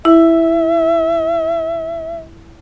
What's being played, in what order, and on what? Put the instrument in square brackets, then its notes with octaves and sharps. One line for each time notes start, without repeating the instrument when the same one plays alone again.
[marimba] E4 [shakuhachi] E5